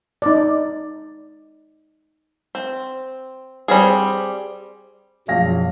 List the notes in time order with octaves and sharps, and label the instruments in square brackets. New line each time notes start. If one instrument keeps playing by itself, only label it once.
[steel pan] D#4 D5
[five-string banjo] C4
G3 C4 G#4
[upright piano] A#1 F5 A#6 [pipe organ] F#2 B2 F#3